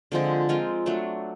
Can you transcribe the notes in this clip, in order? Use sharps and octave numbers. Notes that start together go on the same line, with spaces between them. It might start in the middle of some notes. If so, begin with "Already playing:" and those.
D3 F3 G#3 C4
G#3 C4 F4 A#4
F#3 A3 D4